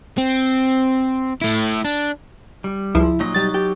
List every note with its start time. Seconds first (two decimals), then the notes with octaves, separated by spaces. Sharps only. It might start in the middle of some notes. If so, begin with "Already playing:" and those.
0.18 C4
1.42 A3 E4
1.84 D4
2.64 G3
2.95 C#2 F3 E4
3.20 A#2 F#3 D#4 D#5
3.34 B1 G3 A6
3.54 G4